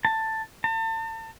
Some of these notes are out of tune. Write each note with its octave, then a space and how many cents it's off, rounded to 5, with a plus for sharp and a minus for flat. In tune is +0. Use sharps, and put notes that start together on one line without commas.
A5 +10
A5 +40